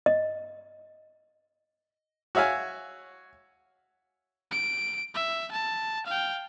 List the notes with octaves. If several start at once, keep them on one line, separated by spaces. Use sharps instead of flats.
D#5
F#4 C#5 E5 F5 G#5
D7
E5
A5
F5 G5